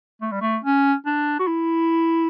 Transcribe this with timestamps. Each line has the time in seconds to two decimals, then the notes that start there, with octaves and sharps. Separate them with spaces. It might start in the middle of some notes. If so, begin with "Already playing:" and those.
0.22 A3
0.32 G3
0.41 A3
0.64 C#4
1.06 D4
1.39 F#4
1.47 E4